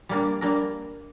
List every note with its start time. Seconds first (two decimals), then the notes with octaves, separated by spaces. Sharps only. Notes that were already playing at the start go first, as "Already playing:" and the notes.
0.09 G3 A#3 D4 A#4
0.41 G3 A#3 D4 A#4